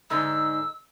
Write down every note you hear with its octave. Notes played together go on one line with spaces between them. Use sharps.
G#2 D3 D#4 E6